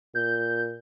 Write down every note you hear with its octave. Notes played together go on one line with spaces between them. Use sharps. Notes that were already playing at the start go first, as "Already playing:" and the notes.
A#2 G6